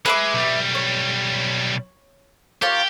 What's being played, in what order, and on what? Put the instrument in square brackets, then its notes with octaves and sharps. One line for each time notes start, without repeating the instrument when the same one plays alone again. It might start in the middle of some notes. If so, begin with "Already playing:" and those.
[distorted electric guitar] G#3 [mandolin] B4 E5 D6
[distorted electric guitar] B1 G3
[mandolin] C#5
[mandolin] A#3 F4 C#5 [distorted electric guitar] G4